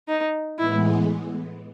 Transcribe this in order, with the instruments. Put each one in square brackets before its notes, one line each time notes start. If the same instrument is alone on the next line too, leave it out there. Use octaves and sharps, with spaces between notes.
[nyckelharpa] D#4
[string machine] A2 E3 G#3 B3 [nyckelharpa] E4